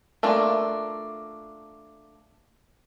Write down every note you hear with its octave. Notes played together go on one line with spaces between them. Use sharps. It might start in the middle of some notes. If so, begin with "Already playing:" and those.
A3 A#3 D4 F4